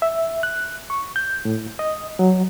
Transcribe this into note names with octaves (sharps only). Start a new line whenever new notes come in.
E5
F#6
C#6
G6
A2
D#5
F#3